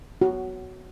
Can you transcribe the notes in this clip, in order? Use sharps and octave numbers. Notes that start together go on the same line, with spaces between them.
F#4